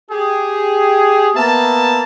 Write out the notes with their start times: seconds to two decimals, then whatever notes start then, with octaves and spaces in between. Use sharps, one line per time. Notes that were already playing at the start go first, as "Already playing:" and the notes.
0.11 G4 G#4
1.35 A#3 B3 E5 A5